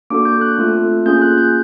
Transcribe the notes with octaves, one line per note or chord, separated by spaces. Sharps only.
A#3 D4 F#4 A4 D6
G6
F#6
A3 C4 F4 A4
A#3 C#4 F4 G#4 G6
F#6
G6